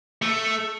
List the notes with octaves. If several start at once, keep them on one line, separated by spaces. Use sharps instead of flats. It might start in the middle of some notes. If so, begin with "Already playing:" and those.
A3